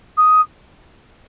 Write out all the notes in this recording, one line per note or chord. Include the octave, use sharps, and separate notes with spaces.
D#6